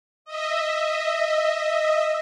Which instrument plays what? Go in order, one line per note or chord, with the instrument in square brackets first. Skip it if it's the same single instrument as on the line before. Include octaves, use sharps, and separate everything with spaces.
[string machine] D#5 E5